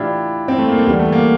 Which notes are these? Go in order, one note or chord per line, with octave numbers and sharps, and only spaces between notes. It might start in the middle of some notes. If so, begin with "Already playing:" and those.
Already playing: A2 E3 D4 E4 F4 G4
C4
A3
A#3
A3
E2 D3 G3
A3
A#3